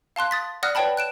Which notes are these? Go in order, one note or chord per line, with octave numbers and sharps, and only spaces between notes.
F5 A5 C6 F#6
D#6 A6 B6
D5 F#5 D#6 F6 F#6 A#6
B4 C#5 D5 G5 A5 B5
F#6 D7 E7